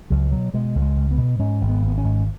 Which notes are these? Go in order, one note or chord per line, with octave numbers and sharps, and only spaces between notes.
C#2 F#3
B2 F#3
B2 G#3
C#2
G#3
C#2
B3
B2
G#2 C#4
G#1
B3
G#1
B3
C#4
G#2